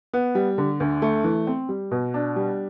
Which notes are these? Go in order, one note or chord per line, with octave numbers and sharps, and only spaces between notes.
B3
G3
D3
D2
A3
E3
C4
G3
B2
D4
G3